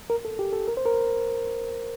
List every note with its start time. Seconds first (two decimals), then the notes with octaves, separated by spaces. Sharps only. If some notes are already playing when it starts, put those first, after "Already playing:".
0.10 A#4
0.25 A4
0.39 G4
0.53 A4
0.68 A#4
0.77 C5
0.85 A#4